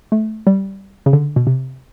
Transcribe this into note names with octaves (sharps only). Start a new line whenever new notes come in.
A3
G3
C#3
D3
B2
C3